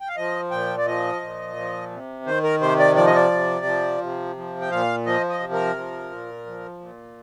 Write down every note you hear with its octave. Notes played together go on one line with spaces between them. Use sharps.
G5
F5
F3 D#5
A#2 G5
D5
F3 D#5
A#2
F3
C3
D#3 C5
A#4
C3 C5
D5
F3 D5
D#5
D5
C3
F3
C3
F3
G5
A#2 F5
F3 D#5
D#5
C3
A#4
F3
A#2
F3
A#2